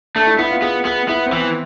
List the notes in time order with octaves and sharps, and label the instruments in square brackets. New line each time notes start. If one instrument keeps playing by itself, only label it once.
[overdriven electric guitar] A3 [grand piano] D4
[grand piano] E4
[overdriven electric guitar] B3 [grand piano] E4
[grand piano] F4
[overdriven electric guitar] B3 [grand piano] G#4
[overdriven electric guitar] B3 [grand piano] G#4
[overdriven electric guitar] B3 [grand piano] E4
[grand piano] C4
[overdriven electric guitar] E3 [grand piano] B3